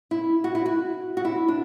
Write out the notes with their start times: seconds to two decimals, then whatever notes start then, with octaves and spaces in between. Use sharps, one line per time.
0.11 E4
0.44 F#4
0.55 E4
0.66 F#4
1.17 F#4
1.25 E4
1.48 D4